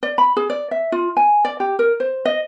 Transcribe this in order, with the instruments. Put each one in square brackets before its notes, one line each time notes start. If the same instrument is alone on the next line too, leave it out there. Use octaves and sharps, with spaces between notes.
[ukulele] D5
B5
G#4
D5
E5
F4
G#5
D5
G4
A#4
C5
D#5